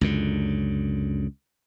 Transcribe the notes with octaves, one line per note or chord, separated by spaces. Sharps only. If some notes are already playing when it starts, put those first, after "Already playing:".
C#2 F#2 D3